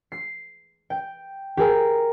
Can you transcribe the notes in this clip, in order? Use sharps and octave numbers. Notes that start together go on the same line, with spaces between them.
C7
G5
G4 G#4 A#4